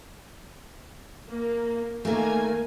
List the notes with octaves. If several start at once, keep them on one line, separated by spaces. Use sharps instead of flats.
A#3
D#3 A3 A#3 G#5